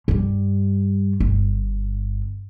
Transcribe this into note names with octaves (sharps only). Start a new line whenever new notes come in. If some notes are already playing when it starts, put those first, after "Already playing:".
G2 G3
G1